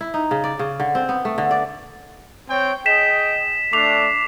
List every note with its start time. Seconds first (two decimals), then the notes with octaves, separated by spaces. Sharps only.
0.01 E4
0.14 D#4
0.31 C#3
0.44 D5
0.59 C#3
0.80 D3
0.95 C4
1.09 B3
1.25 A3
1.38 D3
1.51 D5
2.49 C4 C#5 G5
2.86 G#4 D#5 G5 B6 E7
3.73 A3 D4 D6 C7 F7